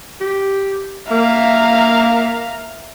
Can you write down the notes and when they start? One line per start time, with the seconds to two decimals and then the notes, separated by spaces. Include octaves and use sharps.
0.21 G4
1.11 A#3 E5 F5 A#5